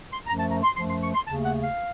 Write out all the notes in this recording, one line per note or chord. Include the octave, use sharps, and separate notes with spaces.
C6
F#2 F3 A3 A#5
A5
A#5
C6
F#2 F3 A3 C6
C6
C#6
C6
D#2 C#3 A3 A5
F#5
F5